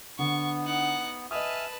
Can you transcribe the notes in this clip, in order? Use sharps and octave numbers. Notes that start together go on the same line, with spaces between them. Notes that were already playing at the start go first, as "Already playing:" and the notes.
D3 B3 C#6
D#4 F#5
B4 D#5 E5 G#5 A5 D#6 F6